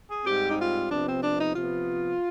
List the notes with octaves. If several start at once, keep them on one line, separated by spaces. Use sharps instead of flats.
G#4
G#2 G3 C4 G4
D#4
F4
C3 F3 B3 D4
C4
D4
D#4
C3 F3 B3 F4